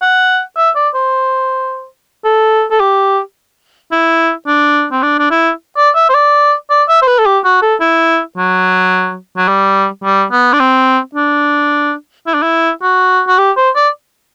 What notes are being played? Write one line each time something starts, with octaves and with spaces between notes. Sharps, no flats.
F#5
E5
D5
C5
A4
A4
G4
E4
D4
C4
D4
D4
E4
D5
E5
C5
D5
D5
E5
C5
B4
A4
G4
F#4
A4
E4
F#3
F#3
G3
G3
B3
D4
C4
D4
E4
D4
E4
F#4
F#4
G4
C5
D5